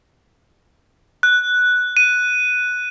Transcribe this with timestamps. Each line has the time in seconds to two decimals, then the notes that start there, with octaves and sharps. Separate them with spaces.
1.23 F#6
1.97 D#7